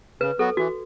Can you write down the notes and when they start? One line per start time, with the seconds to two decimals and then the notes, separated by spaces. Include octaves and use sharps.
0.21 C#3 B4
0.39 F#3 B3 F#4 A4
0.57 E3 F#4